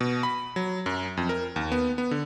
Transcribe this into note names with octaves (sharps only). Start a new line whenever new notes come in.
B2
B5
F#3
F#2
F2
A#4
D#2
B3
B3
D3